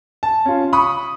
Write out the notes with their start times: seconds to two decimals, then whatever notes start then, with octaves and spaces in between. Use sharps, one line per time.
0.23 A5
0.45 C#4 F4
0.73 B5 C#6 D#6